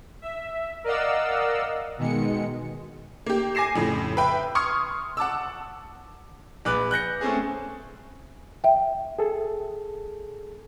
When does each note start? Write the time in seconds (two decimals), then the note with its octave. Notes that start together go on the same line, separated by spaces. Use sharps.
0.22 E5
0.84 A#4 D5 D#5 F5 F#5 E6
1.98 B2 D#3 G#3 C#7
3.26 A#3 G4
3.55 G#5 D6 A#6 C7 E7
3.76 F2 A2 C#3
4.17 B4 E5 G5 B5
4.55 C6 C#6 D#6 F6 G#6 C#7
5.17 F#5 A5 D6 E6
6.65 A#1 B4 D6 F#6
6.91 F#6 G6 A#6 C#7
7.21 A3 C4 C#4 G#4
8.64 E5 G5
9.19 G#4 A4